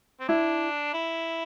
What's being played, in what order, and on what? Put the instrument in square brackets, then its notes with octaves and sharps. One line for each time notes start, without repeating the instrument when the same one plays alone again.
[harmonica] C4
[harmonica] D4 [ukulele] E4
[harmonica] E4